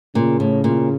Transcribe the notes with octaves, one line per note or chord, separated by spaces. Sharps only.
A#2 C#3
A2
A#2